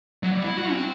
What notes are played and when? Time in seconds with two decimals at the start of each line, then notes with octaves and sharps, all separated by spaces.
0.23 F#3
0.32 G3
0.44 E4
0.57 F#4
0.71 C4